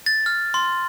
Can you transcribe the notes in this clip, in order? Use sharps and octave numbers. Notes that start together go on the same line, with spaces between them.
A6
F6
C6